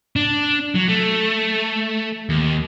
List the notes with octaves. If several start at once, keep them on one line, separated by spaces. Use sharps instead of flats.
D4
F#3
A3
D#2